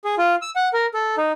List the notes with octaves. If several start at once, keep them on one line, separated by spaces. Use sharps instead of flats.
G#4
F4
E6
F#5
A#4
A4
D#4